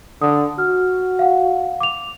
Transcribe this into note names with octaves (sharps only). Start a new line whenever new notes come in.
D3 D#6
F#4 F6
F5 F#5
D6 F7